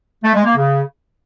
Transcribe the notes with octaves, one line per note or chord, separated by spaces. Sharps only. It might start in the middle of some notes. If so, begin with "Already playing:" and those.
A3
G#3
A#3
C#3